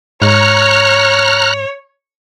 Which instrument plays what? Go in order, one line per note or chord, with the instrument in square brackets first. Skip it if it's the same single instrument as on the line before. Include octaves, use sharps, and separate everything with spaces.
[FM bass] G#2 [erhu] C#5 [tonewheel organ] A#5 F6 F#6